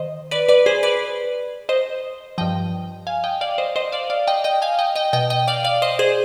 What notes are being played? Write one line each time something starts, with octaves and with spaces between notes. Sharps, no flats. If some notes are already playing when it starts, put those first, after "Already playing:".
Already playing: D#3 C5 D#5
B4 D5
B4 D5
G#4 C5
B4 D5
C5 D#5
G2 F3 D#5 G5
F5 G#5
D#5 G5
D5 F5
C5 D#5
C5 D#5
D5 F5
D5 F5
D#5 G5
D#5 G5
F5 G#5
D#5 G5
D#5 G5
B2 D#5 G5
D#5 G5
D5 F5
D5 F5
C5 D#5
G#4 C5